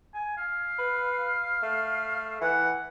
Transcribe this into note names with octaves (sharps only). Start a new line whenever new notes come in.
G#5
F5
B4
A3
E3 F#5